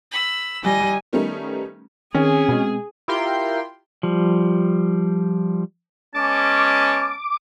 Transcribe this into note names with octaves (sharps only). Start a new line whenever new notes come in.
B5 E6
G3 D#5 G#5
D#3 G3 A3 B3 C#4 D#4
D#3 C4 C#4 G#4
B2 G#3
E4 F4 G4 A#4 G5 C6
F3 G3
G#3 B3 C#4 A5 D6